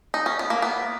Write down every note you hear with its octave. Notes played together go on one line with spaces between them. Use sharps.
D#4
C#4
B3
A#3
B3